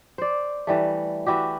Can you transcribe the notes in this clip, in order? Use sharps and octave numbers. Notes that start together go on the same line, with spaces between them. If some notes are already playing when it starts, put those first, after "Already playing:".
C5 D5
E3 G3 A3
E3 E4 F#4 G4